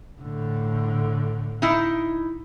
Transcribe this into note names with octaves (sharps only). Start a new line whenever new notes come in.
A2 D3
D#4 E4